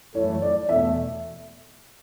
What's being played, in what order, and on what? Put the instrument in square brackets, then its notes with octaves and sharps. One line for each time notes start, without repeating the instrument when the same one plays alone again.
[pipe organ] F#2 E3 A3 [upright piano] C#5
[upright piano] D5
[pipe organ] E2 B2 A3 [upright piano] E5